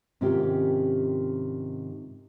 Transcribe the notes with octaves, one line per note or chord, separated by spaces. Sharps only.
G#2 C3 D#3 C#4 F4 G4